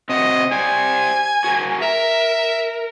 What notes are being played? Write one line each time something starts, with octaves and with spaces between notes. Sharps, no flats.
C3 C4 F#4 D#5
G4 C5 D5 G#5
F#4 G#4 A#4
A#4 E5